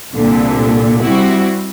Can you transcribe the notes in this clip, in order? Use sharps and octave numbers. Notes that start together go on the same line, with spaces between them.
C2 A#2 D3
G3 C4 E4 F#4